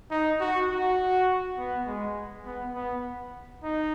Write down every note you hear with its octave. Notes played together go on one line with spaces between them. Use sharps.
D#4
F#4
F#4
B3
G#3
B3
B3
D#4